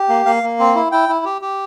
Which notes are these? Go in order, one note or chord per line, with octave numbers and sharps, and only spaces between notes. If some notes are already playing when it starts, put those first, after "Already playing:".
Already playing: G4
A#3
A#3 F5
A#3
C4
E4
E4 G5
E4
G4
G4